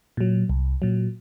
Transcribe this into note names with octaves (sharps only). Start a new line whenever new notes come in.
A#2 F#3
C2
A#2 F#3